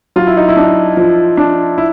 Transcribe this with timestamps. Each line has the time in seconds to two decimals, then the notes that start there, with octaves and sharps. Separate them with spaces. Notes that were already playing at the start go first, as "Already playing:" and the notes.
0.16 F#3 F4
0.27 E4
0.37 D#4
0.49 E4
0.56 D4
0.97 F3
1.37 D4
1.78 E4